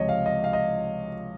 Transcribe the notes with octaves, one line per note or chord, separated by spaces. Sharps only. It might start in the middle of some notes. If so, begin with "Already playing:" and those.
Already playing: C#2 C3 F3 C#5 D#5
F5
D#5
F5
D#5